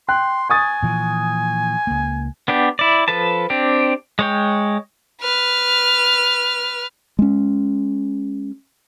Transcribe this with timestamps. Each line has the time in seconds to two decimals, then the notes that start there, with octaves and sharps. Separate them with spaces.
0.09 G5 C6 F#6
0.50 G#5 C#6 D#6 A6
0.83 A#2 E3 F3
1.87 C#2 A#3
2.48 B3 D4 G4
2.79 E4 D5
3.08 F3 A4 B4 A5
3.50 C4 D4 G4
4.19 G#3 C#5 G5
5.21 B4 F6
7.19 G#3 C#4